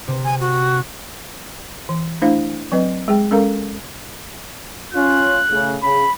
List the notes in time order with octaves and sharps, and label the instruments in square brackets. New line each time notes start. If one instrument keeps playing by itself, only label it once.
[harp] C3
[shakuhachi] G#5
F#4
[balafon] E3
A3 D4 E4 C5 F5
F#3 C4 B4 D#5
G#3 G#4 G5
G#3 C#4 A4 A#4 F5 A#5
[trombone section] C#4 F4 [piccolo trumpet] F#6
[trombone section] A2 C#3
[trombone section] C#3 [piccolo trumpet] B5